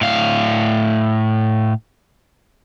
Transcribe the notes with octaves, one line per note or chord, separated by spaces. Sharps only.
A2 F5